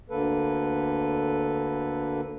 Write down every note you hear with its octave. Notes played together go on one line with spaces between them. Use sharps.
D2 D3 A#3 A4 B4